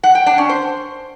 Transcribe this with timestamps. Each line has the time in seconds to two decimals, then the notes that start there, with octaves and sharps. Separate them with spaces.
0.03 F#5
0.15 G5
0.26 D4
0.38 C#4
0.49 C5